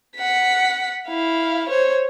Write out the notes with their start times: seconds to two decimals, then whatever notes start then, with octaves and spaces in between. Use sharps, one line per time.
0.16 F#5 B6
1.08 E4 F5
1.69 C5 C#5